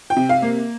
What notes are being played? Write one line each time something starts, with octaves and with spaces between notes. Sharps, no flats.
G5
C3
F5
A#3